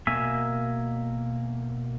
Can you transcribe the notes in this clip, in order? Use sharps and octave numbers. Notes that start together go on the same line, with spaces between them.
B2 A#3 E5 G#5